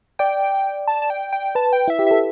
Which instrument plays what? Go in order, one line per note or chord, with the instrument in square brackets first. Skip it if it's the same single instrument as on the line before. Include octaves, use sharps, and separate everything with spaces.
[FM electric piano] D5 [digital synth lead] G5
[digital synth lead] A5
A5
G5
G5
[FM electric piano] B4 [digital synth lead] A5
[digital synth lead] G5
[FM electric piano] E4 [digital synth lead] E5
[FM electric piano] G4
[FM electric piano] A4 [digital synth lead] E5